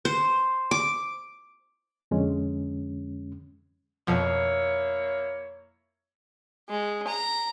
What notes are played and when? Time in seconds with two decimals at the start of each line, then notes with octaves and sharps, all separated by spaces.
0.05 C5
0.71 D6
2.11 F2 D3 G#3 C#4
4.07 F2 B2 F3 A#3 E4 C#5
6.69 G#3
7.07 A#5